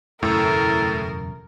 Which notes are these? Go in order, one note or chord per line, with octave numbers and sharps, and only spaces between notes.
E1 F#2 A2 C#3 A4 A#4